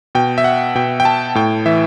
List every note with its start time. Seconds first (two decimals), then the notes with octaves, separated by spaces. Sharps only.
0.15 B2 G5
0.38 E5
0.44 F#5
0.75 B2 G5
1.00 G5
1.05 A5
1.35 A2 G5
1.66 E3 E5